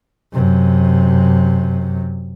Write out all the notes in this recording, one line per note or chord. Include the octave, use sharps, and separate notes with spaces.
F#2 C3